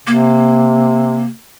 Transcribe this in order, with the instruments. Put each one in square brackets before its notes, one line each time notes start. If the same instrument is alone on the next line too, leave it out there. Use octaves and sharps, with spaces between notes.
[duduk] C3 [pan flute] A#3